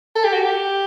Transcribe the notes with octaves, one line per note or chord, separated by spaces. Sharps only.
A4
G4
F#4
G4